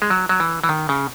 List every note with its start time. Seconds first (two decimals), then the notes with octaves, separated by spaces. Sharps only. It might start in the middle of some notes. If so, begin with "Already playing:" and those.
0.02 G#3
0.10 F#3
0.29 F#3
0.40 E3
0.64 E3
0.69 D#3
0.89 C#3